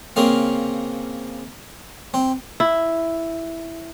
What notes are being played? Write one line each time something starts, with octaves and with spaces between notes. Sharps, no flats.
C#3 A#3 C4 F5
C4
E4